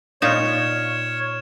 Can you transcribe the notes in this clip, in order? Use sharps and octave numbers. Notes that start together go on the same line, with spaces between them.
A#2 D#4 C#5 F6 E7